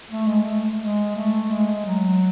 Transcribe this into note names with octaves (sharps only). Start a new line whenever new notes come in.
A3
G#3
A3
G#3
A3
G#3
F#3